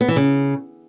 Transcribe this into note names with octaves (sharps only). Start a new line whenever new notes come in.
B3
E3
C#3